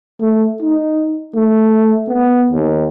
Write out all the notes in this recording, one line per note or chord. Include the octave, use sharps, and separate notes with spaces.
A3
D#4
A3
B3
D#2